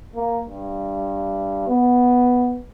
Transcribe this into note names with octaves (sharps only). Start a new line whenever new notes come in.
A#3
G2
B3